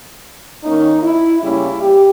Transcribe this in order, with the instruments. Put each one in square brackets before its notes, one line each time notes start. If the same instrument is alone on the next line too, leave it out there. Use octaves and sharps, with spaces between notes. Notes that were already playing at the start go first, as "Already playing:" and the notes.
[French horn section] D#3 A#3 C#4 D#4
E4
C#3 G3 A#3 C#4 E4
G4